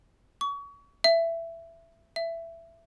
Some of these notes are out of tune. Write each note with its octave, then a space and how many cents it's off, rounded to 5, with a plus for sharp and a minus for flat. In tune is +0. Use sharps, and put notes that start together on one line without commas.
C#6 +35
E5 +15
E5 +15